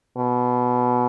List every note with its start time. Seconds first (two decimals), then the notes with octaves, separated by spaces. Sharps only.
0.18 B2